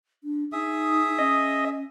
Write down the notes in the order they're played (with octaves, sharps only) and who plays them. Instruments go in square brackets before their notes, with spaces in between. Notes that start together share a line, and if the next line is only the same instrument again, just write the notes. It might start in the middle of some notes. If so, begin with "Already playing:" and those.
[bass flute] D4
[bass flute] D#4 [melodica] G#4 E5 D#6
[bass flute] C#4 [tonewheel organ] D#5